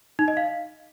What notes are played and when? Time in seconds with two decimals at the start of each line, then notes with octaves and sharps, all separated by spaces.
0.19 D#4
0.28 D#5
0.37 F5